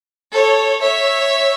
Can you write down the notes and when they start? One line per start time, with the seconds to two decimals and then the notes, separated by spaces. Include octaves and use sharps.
0.33 A4 C#5
0.81 C#5 E5